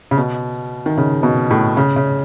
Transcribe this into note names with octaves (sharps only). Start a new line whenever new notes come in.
C#3
B2
D#3
C#3
B2
A2
C#3
C#3